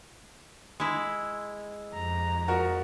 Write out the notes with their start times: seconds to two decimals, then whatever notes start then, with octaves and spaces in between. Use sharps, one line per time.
0.80 G#3 E4
1.94 F2 A#5
2.48 F3 F#4 A#4